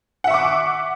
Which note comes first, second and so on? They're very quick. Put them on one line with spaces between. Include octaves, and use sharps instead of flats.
F#5 E5 C#6 D6